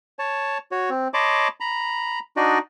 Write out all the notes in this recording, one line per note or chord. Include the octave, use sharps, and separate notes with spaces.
C#5 A5
F#4 C#5
C4
C#5 D#5 A5 B5 C6 D6
A#5 B5
D4 D#4 F#4 D5 D#5